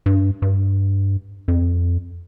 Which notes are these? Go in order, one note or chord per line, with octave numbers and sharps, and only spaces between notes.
G2
G2
F2